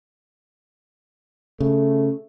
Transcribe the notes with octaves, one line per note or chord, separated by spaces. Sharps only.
C#3 A3